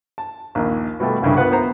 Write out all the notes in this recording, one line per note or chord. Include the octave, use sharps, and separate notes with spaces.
A5
A#1 D#2
B2 G3 A3
C2 G2 C#3 E4
B3 F4 A#4 B4 F#5
B3 C5 A#5